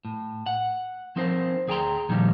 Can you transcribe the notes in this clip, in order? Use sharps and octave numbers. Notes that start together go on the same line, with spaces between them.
A2
F#5
F3 C4 D#4 A#4 C5
D2 G#4 G5 G#5 A#5 C6
A#2 D#3 F3 G3 D#4